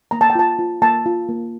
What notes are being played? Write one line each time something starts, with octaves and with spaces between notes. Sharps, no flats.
A#3 A#5
A5
G5
F4 A5
F4
A#3 A5
F4
A#3